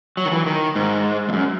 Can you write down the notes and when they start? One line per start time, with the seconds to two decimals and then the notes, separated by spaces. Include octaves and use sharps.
0.17 F#3
0.25 D#3
0.32 E3
0.46 D#3
0.75 G#2
1.29 E2
1.33 F#2